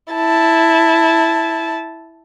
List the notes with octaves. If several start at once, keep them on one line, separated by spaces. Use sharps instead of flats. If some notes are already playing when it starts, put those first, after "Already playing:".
E4 A5